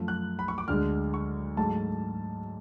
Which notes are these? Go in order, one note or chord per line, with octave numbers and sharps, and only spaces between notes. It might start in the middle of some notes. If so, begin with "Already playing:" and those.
Already playing: F#2 F3 A3
F#6
B5
C#6
D6
D2 D3 G#3 F6
C#6
G#2 F#3 A3 A5